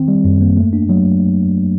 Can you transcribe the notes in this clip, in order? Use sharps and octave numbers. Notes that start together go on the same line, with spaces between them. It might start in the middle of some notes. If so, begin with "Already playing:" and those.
Already playing: D#3 C4
G3
F#2
A#3
A3
D4
F#3